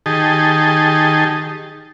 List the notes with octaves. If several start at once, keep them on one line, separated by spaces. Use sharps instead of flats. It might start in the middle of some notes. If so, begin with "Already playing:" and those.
D#3 G4 G#4 D#5 A5